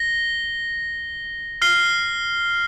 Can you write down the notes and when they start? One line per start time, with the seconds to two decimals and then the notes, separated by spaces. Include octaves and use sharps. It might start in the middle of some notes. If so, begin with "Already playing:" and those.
Already playing: A#6 G7
1.62 F6 C7 G7